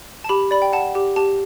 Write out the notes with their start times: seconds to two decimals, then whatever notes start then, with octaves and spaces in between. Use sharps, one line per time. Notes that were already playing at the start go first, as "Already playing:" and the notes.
0.24 A5
0.29 G4 B5
0.51 D5 B5
0.62 G5
0.73 F#5 A5
0.95 G4
1.16 G4 A5